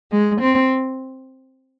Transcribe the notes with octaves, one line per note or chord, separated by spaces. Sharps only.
G#3
C4